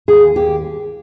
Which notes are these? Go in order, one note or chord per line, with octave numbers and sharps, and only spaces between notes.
D#2 G#4
D#2 G4